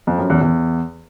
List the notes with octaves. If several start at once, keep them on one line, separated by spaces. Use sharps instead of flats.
F2
F#2
E2
E2